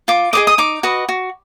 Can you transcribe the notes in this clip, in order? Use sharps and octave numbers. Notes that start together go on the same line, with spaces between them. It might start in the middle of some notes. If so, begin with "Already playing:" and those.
F4 D6
G#4 C5 D#5 D6
D#6
D#4 D6
F#4 B4 D#5
F#4